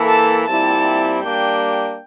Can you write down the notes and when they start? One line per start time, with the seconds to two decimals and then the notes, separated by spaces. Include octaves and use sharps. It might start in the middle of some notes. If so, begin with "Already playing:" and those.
Already playing: E3 A#3 E4 A4
0.09 A5
0.46 A#2 G3 C4 E4 A5
1.22 G3 A#3 D4 G5